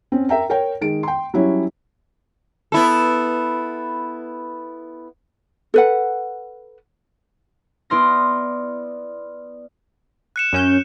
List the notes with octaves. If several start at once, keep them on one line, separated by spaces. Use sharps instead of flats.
C4 C#4
A#4 E5 G5 A#5
A#4 C#5 G5
D#3 G#3 D7
G5 C6
F#3 G3 C#4 E4 C#5
B3 E4 A4
A4 B4 F#5
B3 E4 D5 C6 F6 A#6
F#6 C#7 E7
F#2 C#4 G6